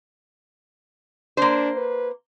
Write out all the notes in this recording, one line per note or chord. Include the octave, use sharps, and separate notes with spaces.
A#3 D4 C5
B4